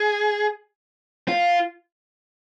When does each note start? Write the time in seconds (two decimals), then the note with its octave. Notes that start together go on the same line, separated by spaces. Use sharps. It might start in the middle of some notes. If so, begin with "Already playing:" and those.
Already playing: G#4
1.28 F4